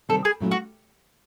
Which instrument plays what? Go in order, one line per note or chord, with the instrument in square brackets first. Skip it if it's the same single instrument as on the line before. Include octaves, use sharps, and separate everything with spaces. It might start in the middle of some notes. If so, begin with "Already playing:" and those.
[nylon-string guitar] C3 D#3 G3 C4 [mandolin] A4
[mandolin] G#4
[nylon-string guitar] A#2 F#3 A3 C#4 E4
[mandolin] F#4